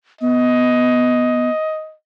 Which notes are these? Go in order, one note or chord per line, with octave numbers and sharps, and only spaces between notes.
B3 D#5